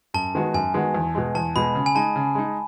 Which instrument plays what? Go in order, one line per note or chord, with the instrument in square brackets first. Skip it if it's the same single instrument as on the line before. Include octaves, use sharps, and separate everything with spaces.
[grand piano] F#2 [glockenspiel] A5
[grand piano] D#3 G#3 B3 F#4
[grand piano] F#2 [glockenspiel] G#5
[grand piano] D#3 G#3 B3 F#4
E2
B2 G#3
[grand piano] E2 [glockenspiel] A5
[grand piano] B2 G#3 [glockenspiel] B5
[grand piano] C#3
[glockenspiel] G#5
[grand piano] G#3 D#4 [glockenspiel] A5
[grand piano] C#3
G#3 D#4